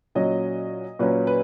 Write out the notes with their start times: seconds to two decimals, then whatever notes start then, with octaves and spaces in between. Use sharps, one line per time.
0.15 A#2 F#3 C#4 D#5
0.99 A#2 F#3 C#4 B4
1.27 B4